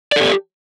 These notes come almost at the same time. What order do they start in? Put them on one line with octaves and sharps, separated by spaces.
D5 A4 G4